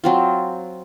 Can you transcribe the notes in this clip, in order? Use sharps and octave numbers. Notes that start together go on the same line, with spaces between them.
F#3 C4 F4